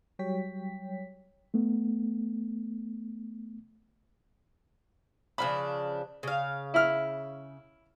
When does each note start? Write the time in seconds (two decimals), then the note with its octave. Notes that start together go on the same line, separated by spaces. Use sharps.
0.19 F#3 G3 C#5 G5 B6
1.54 A3 B3
5.38 C#3 F3 D4 B5
6.23 C#3 F5
6.74 E4 F6